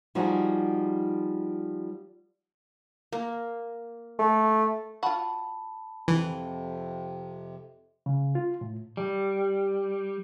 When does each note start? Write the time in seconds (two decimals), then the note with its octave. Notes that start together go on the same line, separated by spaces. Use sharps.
0.15 F3 G3 D#4 F#4 G#4
3.12 A#3
4.19 A3
5.03 F4 F#4 A5 B5
6.08 F2 C3 E3
8.06 C#3
8.35 F4
8.61 A2
8.97 G3